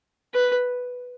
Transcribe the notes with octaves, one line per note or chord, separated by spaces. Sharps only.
B4